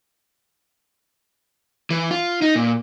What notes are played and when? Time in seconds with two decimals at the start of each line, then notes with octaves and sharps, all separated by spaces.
1.90 E3
2.11 F4
2.42 D#4
2.56 A#2